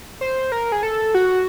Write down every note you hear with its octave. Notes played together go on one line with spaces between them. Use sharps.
C5
A#4
G#4
A4
F#4